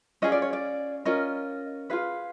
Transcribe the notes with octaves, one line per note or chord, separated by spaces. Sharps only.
C#4 F4 G#4 D#5
D5
C#5
D5
C#4 F4 A#4 D#5
F4 G#4 B4 F5